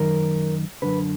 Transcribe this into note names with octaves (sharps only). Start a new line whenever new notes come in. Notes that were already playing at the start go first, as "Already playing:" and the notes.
Already playing: F#2 D#3 A#4
F#2 D3 B4